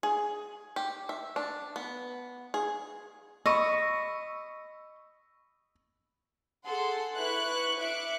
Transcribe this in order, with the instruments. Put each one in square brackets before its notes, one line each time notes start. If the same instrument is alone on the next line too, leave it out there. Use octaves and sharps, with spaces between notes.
[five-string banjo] G#4
G4
E5
D4
B3
G#4
[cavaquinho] D#5 [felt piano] B5 C#6 E6
[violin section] G#4 A4 F#5 C6
E4 B4 C#6 F#6
E5 D6 F#6 C#7